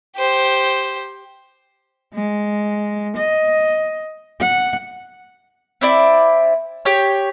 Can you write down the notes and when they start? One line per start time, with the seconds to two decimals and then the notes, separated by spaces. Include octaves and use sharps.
0.17 G4 C5
2.14 G#3
3.17 D#5
4.40 F#5
5.81 C4 E4 D5
6.85 G4 C#5